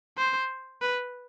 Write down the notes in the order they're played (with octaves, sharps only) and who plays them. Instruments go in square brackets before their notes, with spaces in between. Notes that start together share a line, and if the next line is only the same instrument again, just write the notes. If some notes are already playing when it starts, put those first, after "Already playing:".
[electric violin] C5
B4